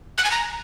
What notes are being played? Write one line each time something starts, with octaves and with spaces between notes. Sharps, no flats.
F#6
G#5
A#5